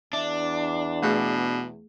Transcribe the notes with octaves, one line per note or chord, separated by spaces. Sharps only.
E2 D4 E5
B2 A3 G#4